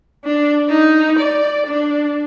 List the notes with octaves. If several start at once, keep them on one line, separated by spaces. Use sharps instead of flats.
D4
D#4
D5
D4